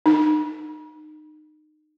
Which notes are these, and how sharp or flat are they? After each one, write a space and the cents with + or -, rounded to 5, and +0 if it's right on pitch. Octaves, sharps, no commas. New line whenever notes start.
D#4 -25